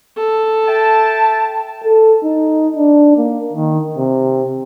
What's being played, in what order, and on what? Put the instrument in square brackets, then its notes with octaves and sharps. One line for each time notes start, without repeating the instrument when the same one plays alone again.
[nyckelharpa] A4
[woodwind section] E5 G5 A5
[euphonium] A4
D#4
D4
A#3
D#3
C3